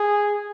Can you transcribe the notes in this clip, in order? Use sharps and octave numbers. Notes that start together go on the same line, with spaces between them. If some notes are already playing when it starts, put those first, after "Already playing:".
Already playing: G#4